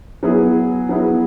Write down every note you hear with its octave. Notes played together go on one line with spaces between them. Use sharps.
F#3 B3 E4 G#4
F#3 B3 E4 G#4